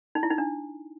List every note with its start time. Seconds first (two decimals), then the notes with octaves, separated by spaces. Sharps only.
0.15 D#4
0.23 E4
0.31 D#4
0.38 D4